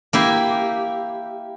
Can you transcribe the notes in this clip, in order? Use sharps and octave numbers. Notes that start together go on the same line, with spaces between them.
A#3 E4 G4